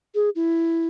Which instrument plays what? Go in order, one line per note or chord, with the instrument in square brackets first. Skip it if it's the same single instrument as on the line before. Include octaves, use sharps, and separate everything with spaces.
[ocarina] G#4
E4